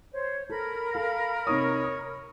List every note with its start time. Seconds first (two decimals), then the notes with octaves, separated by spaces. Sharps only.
0.13 C5 C#5
0.49 A4 A#4 B5
0.95 A4 F5
1.47 C3 D#4 C#5 D#6
1.84 D#6